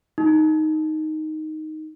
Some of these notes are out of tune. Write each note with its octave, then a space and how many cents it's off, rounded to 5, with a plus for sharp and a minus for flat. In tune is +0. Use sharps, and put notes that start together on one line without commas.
D#4 +0